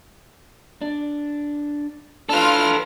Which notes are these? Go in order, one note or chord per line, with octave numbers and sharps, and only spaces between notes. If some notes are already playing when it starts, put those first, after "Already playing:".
D4
D4 F4 A4 B4 F6